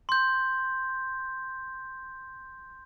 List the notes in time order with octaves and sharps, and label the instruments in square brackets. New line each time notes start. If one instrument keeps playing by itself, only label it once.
[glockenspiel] C6 G6